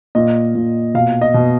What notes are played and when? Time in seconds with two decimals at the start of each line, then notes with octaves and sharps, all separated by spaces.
0.15 A#2 D#5
0.55 A#2
0.94 B2 F5
1.21 D#5
1.34 B2